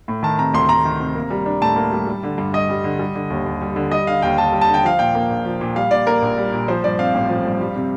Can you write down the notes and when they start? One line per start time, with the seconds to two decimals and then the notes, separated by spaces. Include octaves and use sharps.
0.08 A2
0.23 D#3 A5
0.38 C3 A#5
0.54 D2 C6
0.69 D2 A#5
0.85 D#3
0.99 C3
1.15 A#3
1.30 G3
1.46 D4
1.61 A2 A5
1.76 A#3
1.92 G3
2.07 G3
2.23 D3
2.38 G2
2.53 G2 D#5
2.69 G3
2.84 D3
2.99 G3
3.15 D3
3.30 D#2
3.46 D#2
3.61 G3
3.76 D3
3.91 G3 D#5
4.07 D3 F5
4.22 D#2 G5
4.38 D#2 A5
4.53 G3
4.61 A5
4.68 D3
4.74 G5
4.83 F3 F5
4.99 A#2 G5
5.15 A#3
5.30 A#1
5.45 F3
5.61 A#2
5.76 G3 F5
5.91 A#2 D5
6.06 A#3 A#4
6.22 A#1
6.37 G3
6.53 A#2
6.68 F3 C5
6.84 G2 D5
6.99 C4 F5
7.14 A1
7.29 F3
7.45 G2
7.61 G3
7.76 C3